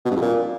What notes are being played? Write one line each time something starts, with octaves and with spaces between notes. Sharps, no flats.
B2
G2
F2
A#2